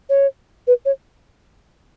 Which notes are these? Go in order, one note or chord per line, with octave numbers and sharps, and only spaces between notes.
C#5
B4
C#5